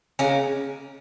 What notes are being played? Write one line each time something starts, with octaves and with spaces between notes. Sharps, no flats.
C#3 G#3 A#3 C#4